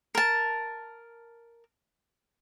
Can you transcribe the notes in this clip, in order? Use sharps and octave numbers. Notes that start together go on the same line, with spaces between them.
A#4 A5